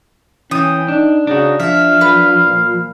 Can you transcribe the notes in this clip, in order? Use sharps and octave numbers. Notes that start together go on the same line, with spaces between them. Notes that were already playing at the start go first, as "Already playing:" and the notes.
E3 C#4 G5 D#6
D4 D#4
C#3 D4 D#4 F#4
F3 D4 E5 F5
B4
A#2